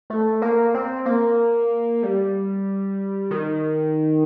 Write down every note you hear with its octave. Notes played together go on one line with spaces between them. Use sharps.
A3
A#3
C4
A#3
G3
D#3